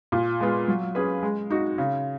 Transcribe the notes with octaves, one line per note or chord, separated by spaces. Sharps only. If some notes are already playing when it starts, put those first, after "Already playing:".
A#2
G#3 B3 F4
F#3
C#4 G#4 B4
G#3
D#4 F#4
C#3